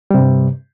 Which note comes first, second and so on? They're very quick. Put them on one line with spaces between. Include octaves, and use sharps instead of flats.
G3 C3 G2